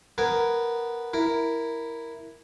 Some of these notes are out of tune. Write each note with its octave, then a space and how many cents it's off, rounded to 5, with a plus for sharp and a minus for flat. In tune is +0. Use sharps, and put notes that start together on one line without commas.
B3 +0 A#4 +0 G#5 -5
E4 +0 A#4 +0